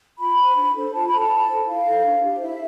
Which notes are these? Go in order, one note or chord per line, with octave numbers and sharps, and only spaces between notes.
F4 B5
C5
D4
A4 C5
F4 A5
B5
A4 C5
A5
E4
A4 C5
E4 F5
A4 C5
D4
G4 C5
E4 E5